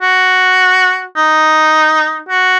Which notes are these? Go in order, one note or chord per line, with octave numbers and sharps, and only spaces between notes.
F#4
D#4
F#4